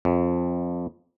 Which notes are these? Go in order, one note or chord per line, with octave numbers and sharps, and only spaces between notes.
F2